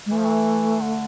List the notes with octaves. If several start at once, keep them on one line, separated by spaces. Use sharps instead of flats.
G#3
E3 A3
F3
E3
D3